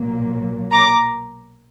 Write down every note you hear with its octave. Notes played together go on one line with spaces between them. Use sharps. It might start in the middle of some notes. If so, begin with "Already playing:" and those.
Already playing: B1 A#2 F#3 A#3
A#5 D6